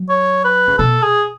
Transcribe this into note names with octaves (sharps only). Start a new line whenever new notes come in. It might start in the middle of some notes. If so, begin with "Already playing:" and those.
Already playing: F#3
C#5
B4
C#3
B2 A4
G#4